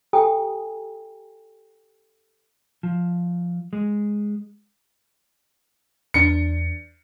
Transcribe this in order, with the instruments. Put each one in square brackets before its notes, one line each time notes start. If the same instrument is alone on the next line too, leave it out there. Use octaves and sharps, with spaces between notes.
[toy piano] G4 A4 G5 G#5 A#5 D#6
[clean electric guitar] F3
G#3
[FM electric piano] E2 D4 [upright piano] C#7